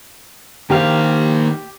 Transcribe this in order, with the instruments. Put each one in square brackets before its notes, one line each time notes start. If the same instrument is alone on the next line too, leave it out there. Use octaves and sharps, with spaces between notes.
[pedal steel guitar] D#3 F5 [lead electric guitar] A#3 C5 [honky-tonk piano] G4